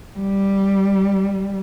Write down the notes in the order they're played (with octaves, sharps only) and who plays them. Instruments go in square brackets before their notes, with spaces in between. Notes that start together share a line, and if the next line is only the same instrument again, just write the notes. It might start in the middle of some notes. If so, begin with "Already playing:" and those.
[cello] G3